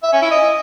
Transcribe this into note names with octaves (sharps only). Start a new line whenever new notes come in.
E5
C#4
E4
D#5